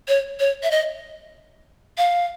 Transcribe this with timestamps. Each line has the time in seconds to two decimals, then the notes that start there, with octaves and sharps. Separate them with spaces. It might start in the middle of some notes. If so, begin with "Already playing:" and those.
0.08 C#5
0.40 C#5
0.63 E5
0.71 D#5
1.98 F5